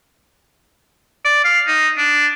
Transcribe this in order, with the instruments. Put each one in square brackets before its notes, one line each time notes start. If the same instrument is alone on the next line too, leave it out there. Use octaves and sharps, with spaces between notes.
[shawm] D5
F5
D#4
D4